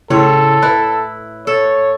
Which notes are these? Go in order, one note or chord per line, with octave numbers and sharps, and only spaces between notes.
A2 C#3 A4 C#5 C6
E4 B4 F#6
A4 C#5